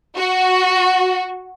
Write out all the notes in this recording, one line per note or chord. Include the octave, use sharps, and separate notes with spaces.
F#4